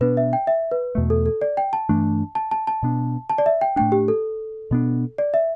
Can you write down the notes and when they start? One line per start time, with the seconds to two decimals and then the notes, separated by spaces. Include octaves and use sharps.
0.01 B2 B3 D4 B4
0.17 E5
0.33 G5
0.47 E5
0.71 B4
0.95 E2 B2 A3
1.10 A4
1.26 A4
1.41 D5
1.57 G5
1.73 A5
1.89 G2 E3 A3 D4
2.35 A5
2.51 A5
2.67 A5
2.83 B2 B3 D4
3.29 A5
3.38 D5
3.46 E5
3.61 G5
3.76 A2 A3 D4 G5
3.92 G4
4.08 A4
4.71 B2 B3 D4
5.18 D5
5.34 E5